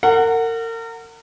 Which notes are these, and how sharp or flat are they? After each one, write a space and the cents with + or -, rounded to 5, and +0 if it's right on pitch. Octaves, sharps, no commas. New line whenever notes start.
A#4 -35 F#5 -5